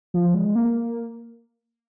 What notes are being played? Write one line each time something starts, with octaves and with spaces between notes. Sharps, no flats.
F3
G#3
A#3